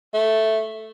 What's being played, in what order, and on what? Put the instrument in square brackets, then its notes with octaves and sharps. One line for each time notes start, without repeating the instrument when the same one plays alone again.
[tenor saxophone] A3